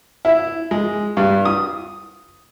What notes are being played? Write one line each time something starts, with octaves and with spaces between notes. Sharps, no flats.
E4
G#3
G2
D#6